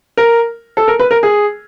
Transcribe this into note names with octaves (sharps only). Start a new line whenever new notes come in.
A#4
A4
A#4
B4
A#4
G#4